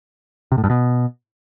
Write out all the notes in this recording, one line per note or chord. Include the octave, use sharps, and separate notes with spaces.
C3
A2
G2
B2